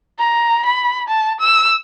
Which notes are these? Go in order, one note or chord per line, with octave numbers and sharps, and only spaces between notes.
A#5
B5
A5
E6